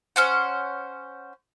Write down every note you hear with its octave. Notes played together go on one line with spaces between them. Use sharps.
C#4 C5 F#5